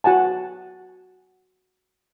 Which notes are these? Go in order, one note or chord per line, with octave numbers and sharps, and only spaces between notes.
F#4 F#5 G#5 A5